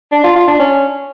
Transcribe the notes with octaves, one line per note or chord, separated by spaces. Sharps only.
D4
F4
F4
D4
C#4